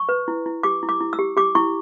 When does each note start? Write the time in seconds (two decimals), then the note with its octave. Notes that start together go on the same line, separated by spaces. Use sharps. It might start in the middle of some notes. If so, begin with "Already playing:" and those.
Already playing: C#6
0.09 B4
0.28 E4
0.46 E4
0.63 G4 D6
0.83 E4
0.89 D6
1.01 E4
1.13 E6
1.19 G4
1.37 G4 D6
1.55 E4 C#6